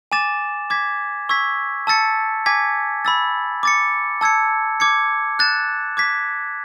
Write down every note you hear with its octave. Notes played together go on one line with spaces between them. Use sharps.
G#5 D6 A6 E7
D6 G#6 B6
C#6 E6 G#6 B6
A5 E6 A6 C#7
G#5 D6 G#6 B6
B5 E6 A6
D6 A6 C#7
A5 E6 G#6 C#7
D6 G#6 C#7
F#6 A6 E7
D6 G#6 B6